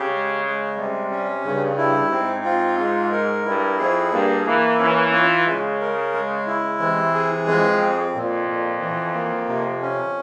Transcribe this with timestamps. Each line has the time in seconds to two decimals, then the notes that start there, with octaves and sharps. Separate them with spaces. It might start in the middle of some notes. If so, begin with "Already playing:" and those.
Already playing: C#3 G4
0.10 G#3
0.44 G#3
0.77 C3 G3
1.11 C#4
1.44 G2 C#3
1.78 E4
2.11 G#2 C4
2.45 F4
2.78 G#3
3.12 A#4
3.45 G2 E4
3.79 F2 G#4
4.12 G2 A#3
4.46 E3 A#3
4.79 E3 C#4
5.13 F4
5.46 C#3 G#3
5.80 A#4
6.13 G#3
6.47 E4
6.80 C3 E3
7.14 G#4
7.47 F2 G#3
7.81 C4
8.14 F2 A#2
8.49 A#2
8.81 E3
9.14 A#3
9.48 C3
9.82 C#4